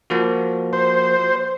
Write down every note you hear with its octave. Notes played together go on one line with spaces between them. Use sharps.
F3 A#3 F#4
C5